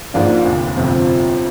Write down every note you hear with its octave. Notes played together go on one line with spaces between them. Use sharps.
G#2 F3 A#3 D4
F1 D#2 D3
G1 F2 C3 F3 C4